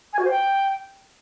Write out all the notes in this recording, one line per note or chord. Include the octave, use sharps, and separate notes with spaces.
G#5
F#4
C5
G5